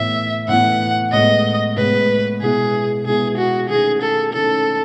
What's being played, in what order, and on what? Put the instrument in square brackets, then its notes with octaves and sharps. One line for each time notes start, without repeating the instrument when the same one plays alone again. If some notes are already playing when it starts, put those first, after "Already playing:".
Already playing: [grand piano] A2 E3 B3 E4 [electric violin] E5
[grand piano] A2 E3 B3 E4 [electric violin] F#5
[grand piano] A2 G#3 B3 [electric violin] D#5
[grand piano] A2 G#3 B3 [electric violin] B4
[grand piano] B2 G#3 B3 E4 [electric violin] G#4
[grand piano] B2 G#3 B3 E4 [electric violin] G#4
[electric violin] F#4
[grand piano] D#3 A3 C#4 E4 [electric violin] G#4
[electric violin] A4
[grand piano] D#3 A3 C#4 E4 [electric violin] A4